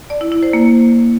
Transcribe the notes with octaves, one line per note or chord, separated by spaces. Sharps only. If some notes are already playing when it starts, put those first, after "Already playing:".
D5
E4
E4
C5
A#3